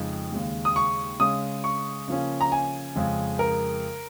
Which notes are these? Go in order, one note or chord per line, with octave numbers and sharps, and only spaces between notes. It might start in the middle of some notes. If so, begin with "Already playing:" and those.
Already playing: F2 C#3 G#3 D#4
D#2 C#3 G#3
D#6
C#6
C#3 G#3 C#4 D#6
C#6
C#3 F3 A#3 C#4
A#5
G#5
F2 C#3 G#3
A#4